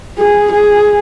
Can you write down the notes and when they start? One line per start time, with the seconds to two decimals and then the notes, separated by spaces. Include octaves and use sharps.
0.19 G#4
0.53 G#4